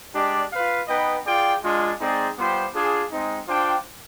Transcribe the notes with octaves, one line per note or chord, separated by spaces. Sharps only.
G#3 D4 G4 D5
F4 B4 F5
B3 D#4 B4 D#5 G5
F4 G#4 D5 G5
G#3 D4 F4
G#3 C4 D#4 G#4 D5
G3 B3 F4 C5 G5
D4 F4 G#4
G#3 C4 D#4
D4 F4 C5 G5